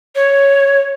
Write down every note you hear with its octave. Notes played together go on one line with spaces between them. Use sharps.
C#5